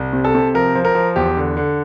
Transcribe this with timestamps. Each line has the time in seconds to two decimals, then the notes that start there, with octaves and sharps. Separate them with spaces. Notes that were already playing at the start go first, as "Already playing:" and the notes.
Already playing: C2
0.13 C3
0.25 A4
0.35 C3
0.54 F3 A#4
0.75 F3
0.85 A#4
0.95 F3
1.16 E2 G4
1.37 D3
1.57 D3